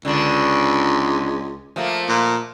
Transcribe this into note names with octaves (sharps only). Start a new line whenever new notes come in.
C#2 D3 D4
F3 A3 A#3
A#2